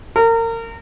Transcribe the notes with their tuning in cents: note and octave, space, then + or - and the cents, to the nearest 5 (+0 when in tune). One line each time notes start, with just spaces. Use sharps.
A#4 -30